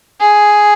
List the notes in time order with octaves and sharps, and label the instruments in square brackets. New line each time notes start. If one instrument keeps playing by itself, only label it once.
[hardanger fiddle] G#4